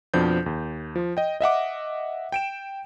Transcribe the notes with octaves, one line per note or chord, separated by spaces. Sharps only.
F2 B2 F3 D4 G6
D#2
F3
D#5 G5
D#5 E5 F#5 D6
G5 D7 E7